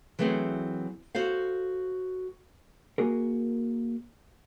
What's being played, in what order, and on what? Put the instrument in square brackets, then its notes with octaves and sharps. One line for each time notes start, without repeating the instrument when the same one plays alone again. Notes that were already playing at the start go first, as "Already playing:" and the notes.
[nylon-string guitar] E3 F#3 A3 C4 G#4 A4
F#4 A4 C5 F5
[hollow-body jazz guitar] A#3 F#4 G#4 A#4